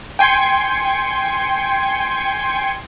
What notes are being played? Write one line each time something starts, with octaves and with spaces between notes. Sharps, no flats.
G5 G#5 C6 G#6 C#7